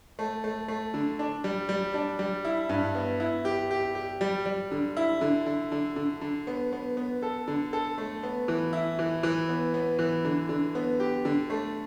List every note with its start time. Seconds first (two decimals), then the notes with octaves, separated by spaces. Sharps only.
0.19 A3
0.44 A3
0.68 A3
0.94 D3
1.19 D4
1.44 G3
1.69 G3
1.94 D4
2.19 G3
2.45 E4
2.69 G2
2.95 B3
3.20 E4
3.45 G4
3.71 G4
3.95 G4
4.21 G3
4.46 G3
4.71 D3
4.97 E4
5.21 D3
5.46 D3
5.72 D3
5.96 D3
6.21 D3
6.47 B3
6.73 B3
6.97 B3
7.22 A4
7.48 D3
7.73 A4
7.98 A3
8.23 B3
8.48 E3
8.73 E4
8.99 E3
9.23 E3
9.49 B3
9.74 B3
9.99 E3
10.25 D3
10.49 D3
10.75 B3
11.00 G4
11.25 D3
11.50 A3